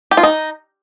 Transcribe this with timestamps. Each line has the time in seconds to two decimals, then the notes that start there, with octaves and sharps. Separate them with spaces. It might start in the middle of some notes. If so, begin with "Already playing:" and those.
0.11 G4
0.17 F4
0.23 D#4